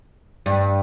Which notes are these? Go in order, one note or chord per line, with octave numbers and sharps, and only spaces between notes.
G2